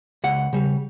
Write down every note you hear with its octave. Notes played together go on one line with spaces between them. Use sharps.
C#2 F#5
C#3 G3